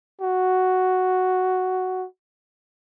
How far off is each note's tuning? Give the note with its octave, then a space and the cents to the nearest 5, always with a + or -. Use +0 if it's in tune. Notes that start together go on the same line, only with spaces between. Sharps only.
F#4 +5